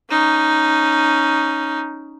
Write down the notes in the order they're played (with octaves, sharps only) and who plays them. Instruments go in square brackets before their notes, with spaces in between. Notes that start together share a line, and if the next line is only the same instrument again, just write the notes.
[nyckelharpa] C#4 D#4